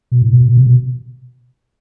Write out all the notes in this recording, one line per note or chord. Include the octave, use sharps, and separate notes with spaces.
B2
A2
B2
B2
C3
B2